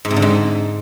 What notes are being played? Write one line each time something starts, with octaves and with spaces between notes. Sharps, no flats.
G#2
C3
D3
G#2